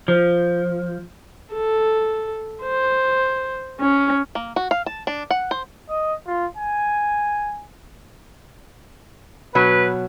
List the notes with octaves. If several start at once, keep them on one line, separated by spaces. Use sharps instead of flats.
F3
A4
C5
C#4
A#3
F#4
F5
A5
D4
F#5
C5
D#5
F4
G#5
B2 F#3 B4